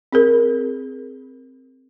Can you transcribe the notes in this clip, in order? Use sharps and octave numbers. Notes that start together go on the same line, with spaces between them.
C4 G#4 A#4